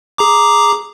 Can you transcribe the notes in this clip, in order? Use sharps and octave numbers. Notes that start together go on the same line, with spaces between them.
G#4 A#5 D6